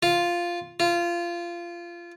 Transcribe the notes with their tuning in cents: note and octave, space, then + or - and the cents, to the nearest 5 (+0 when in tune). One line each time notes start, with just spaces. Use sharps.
F4 -5
F4 -20